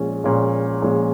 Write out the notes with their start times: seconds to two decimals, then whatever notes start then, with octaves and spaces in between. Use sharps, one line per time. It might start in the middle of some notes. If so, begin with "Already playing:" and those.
Already playing: A#1 A#2 G#3 C#4
0.24 A#1 A#2 G#3 C#4
0.82 A#1 A#2 G#3 C#4